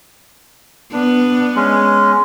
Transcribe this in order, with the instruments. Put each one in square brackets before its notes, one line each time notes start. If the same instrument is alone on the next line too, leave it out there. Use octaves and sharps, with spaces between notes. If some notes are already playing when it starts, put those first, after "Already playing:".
[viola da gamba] B3 [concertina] D4
[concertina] G#3 C#4